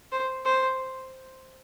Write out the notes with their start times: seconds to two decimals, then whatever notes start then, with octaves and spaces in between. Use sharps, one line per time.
0.12 C5
0.45 C5